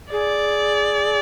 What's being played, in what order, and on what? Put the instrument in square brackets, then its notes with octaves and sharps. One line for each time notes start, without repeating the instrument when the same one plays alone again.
[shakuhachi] G#4 [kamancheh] D5